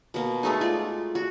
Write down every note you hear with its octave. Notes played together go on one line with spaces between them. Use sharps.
B2 A#3
G#3 A3 D#4
F4 D5
F#4